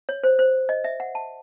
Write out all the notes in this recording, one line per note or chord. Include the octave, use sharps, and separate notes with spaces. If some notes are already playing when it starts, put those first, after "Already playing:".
C#5
C5
C5
D#5
E5
F#5
A5